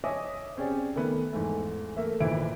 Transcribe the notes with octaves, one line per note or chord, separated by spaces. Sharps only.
C#5 D#5 E5 G#5 D6 D#6
C4 C#4 G4 G#4 D5
D#3 A3 B3
E2 G#2 G#3 A3
A3 A#3 E5
G#1 A#2 E3 E4 D7